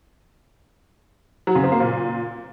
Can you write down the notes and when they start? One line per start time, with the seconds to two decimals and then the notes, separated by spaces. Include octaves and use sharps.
1.47 F#3
1.55 C#3
1.64 C4
1.72 A#3
1.80 A#2